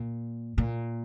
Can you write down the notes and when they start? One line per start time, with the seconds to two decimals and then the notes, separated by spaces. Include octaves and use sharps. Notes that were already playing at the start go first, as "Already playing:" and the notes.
Already playing: A#2
0.58 A#2